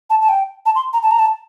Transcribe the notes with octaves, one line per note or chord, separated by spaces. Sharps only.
A5
A5
G5
A5
C6
A#5
A5
A#5
A5